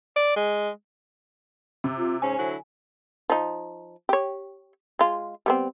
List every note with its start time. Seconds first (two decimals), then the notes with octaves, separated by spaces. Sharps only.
0.16 D5
0.36 G#3
1.84 C3
1.98 F4
2.22 G#2 C#4 C5 G#5
2.39 D3 F#3 E4
3.30 F3 D#4
4.09 G4 C#5
4.99 G#3 F4
5.46 G3 B3 C4